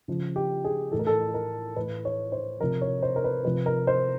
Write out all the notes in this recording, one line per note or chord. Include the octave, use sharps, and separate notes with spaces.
C#3 F3
G4
G#4
A2 E3 A4
A#4
A4
A#4
A2 E3 B4
C#5
C5
C3 F3 A#4
C#5
C5
A#4
B4
C3 F3 B4
A#4
C5